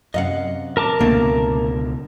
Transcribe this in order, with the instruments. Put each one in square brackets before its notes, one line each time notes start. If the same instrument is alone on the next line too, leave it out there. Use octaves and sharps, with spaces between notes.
[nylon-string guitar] F#2 C3 [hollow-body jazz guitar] D#5 F5 F#5
[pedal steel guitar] A#4 A5 D6
[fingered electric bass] C#2 B2 D3 [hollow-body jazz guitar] A3 A#3